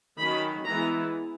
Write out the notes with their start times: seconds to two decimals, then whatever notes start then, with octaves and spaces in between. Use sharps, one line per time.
0.19 D#3 F#3 C#4 B5
0.64 E3 G#3 B3 A#5